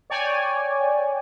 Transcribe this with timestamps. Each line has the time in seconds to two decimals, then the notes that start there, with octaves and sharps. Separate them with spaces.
0.10 C#5 D5 G5 G#5